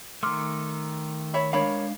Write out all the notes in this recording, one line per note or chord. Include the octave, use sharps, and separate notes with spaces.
D#3 A3 C6 D6 F6
C#5 E5 B5
G#3 D4 A#4 C#5 F5 B5